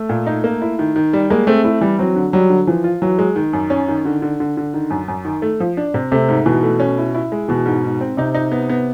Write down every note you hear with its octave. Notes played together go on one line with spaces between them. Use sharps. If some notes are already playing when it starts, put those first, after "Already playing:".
Already playing: A3
A#2
D#4
A#3
E4
D#3
D#3
G3
G#3 A#3
A3 C4
A3 E4
E3 G3
F#3 C4
D3
F#3 G3
D3
E3 F3
F4
E3 F#3
G#3
D#3
F#2
C#4
D#3
D3
D3
D3
D3
D#3
F#2
F#2
D#3
A3
F3
D4
C3
C3 A3
G#2
B2 E3
A3
C#4
E4
E4
G#3
B2 E3
G#2
G#2
C4
C3 D#4
D#4
B3
B3